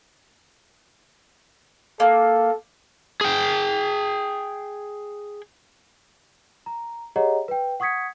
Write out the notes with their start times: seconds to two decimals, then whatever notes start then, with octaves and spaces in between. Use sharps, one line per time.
2.00 A#3 A4
3.21 G#4 G5
6.66 A#5
7.16 G4 G#4 C#5 D#5 F#5 A#5
7.48 B4 G5
7.80 F#5 C#6 D#6 G#6 B6 C#7